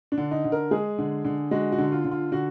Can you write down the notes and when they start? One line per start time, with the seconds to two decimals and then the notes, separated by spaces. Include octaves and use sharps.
0.12 D4
0.18 D3
0.31 D#4
0.44 D3
0.52 A#4
0.71 G#3 G#4
0.98 D3
1.25 D3
1.51 G#3 F#4
1.72 F#4
1.78 D3
1.92 F4
2.05 D3
2.11 F4
2.32 D3 F#4